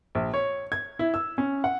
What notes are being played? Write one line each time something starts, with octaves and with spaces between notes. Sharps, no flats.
A#1
C#5
G#6
E4
E6
C#4
F#5